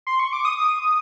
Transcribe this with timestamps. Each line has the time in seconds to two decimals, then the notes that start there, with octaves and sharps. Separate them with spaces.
0.07 C6
0.19 C#6
0.33 D6
0.45 D#6
0.58 D#6